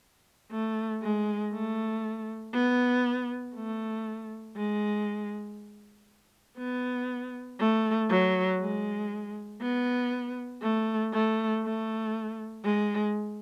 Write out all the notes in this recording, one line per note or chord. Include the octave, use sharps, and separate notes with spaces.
A3
G#3
A3
B3
A3
G#3
B3
A3
F#3
G#3
B3
A3
A3
A3
G#3